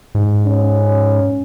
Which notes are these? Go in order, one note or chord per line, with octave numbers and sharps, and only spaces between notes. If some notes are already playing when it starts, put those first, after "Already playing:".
G#2
C#4